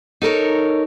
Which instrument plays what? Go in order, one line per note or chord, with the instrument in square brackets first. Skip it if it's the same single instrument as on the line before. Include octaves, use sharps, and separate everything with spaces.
[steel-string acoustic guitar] D#4 A4 A#4 C#5